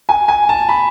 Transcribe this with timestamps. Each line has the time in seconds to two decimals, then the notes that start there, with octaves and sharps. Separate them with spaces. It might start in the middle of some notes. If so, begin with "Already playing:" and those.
0.09 G#5
0.28 G#5
0.49 A5
0.69 B5